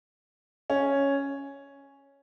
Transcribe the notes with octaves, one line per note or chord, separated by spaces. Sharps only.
C#4